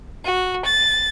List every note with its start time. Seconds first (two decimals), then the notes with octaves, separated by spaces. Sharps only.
0.25 F#4
0.63 A6